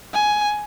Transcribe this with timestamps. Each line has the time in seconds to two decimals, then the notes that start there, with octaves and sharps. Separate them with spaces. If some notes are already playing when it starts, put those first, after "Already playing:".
0.13 G#5